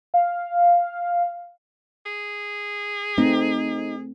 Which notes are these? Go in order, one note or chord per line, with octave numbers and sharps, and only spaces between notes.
F5
G#4
A3 C4 D#4